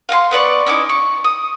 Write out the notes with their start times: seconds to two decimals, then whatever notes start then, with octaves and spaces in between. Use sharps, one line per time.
0.09 F5 F#5 G#5 C6
0.31 B3 B4 D5 C#6
0.66 C#4 D#4 E4 D6
0.89 C#6
1.24 D#6